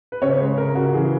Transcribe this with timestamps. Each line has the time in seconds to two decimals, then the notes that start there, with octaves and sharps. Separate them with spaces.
0.12 B4
0.22 C#3 C#5
0.40 G#3
0.58 C#3 A#4
0.75 C#3 F#4
0.94 E3 G#4